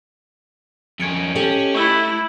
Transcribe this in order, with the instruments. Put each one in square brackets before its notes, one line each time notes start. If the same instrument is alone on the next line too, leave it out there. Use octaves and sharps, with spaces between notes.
[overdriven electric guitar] F2 C#4 [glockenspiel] G#6 C#7 D7
[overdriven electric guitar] C#4 [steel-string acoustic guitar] G4 A4 D#5 [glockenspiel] F#7
[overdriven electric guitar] A3 [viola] E4 [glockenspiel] C#6 E6